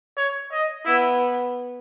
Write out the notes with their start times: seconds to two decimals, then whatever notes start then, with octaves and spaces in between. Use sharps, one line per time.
0.17 C#5
0.51 D#5
0.85 B3 E4